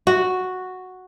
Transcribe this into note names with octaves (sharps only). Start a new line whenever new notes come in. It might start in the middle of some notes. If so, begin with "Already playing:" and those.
F#4